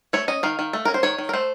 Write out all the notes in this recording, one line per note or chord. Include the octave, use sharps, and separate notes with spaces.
A3 C#5
C#4 D#5
D#3 F5
D#3
A3
C#4 A#4
C5
D#3 C#5
D#3
A#4
A3 C5